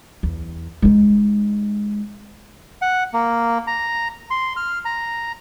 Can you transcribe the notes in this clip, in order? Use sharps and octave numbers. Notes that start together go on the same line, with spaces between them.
E2
G#3 D#4
F#5
A#3
A#5
C6
F6
A#5